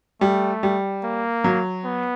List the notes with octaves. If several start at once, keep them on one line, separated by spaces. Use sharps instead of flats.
G3 A3
G3
A#3
F#3
B3